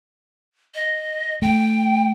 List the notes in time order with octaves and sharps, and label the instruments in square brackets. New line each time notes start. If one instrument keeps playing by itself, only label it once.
[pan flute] D#5
[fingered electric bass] A3 [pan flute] G5